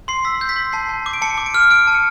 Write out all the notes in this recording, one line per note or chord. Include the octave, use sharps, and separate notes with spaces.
C6 C7
E6 B6
G6
B6
C6
A5 C7
A5
D6
D7
A5 C#7
D6
D7
F6
F6 D7
A5
C#7